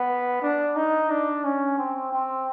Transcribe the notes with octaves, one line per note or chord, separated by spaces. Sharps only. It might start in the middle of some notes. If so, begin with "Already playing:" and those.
Already playing: B3
D4
D#4
D4
C#4
C4
C4